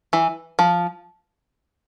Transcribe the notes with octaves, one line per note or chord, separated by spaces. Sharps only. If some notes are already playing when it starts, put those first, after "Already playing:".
E3
F3